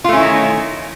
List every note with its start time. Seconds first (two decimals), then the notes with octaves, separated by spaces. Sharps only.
0.04 F4
0.09 A3
0.13 C#4
0.17 E4
0.21 D#3